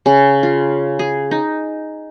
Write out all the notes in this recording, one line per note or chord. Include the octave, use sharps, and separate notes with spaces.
C#3
F4
G#4
D#4